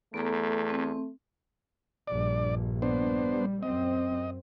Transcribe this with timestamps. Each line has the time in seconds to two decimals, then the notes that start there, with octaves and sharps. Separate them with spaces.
0.14 E2 A3 B3 A4 A#5
0.70 C4
2.08 A#1 G2 D5
2.82 B3 D4 C5
3.26 G3
3.63 F#2 C4 D#5